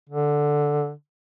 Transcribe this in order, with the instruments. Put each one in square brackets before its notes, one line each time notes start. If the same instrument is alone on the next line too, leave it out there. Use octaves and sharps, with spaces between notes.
[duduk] D3